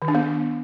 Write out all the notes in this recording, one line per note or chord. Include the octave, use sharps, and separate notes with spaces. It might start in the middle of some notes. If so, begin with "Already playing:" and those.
D#3
D4
B3